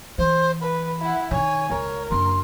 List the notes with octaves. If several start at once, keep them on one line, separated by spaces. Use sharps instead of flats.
E3 C5
B4 B5
E4 F#5
D3 D#3 C#5 G#5
C#2 A#4 C#5
F#1 D4 C6